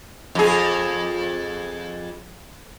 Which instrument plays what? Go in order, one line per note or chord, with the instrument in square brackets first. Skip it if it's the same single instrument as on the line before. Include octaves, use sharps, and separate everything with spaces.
[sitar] F2 G#4